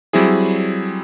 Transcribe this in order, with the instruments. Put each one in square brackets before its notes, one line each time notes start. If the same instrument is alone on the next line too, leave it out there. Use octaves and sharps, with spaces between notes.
[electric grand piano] F#3 G3 C4 E4 G#4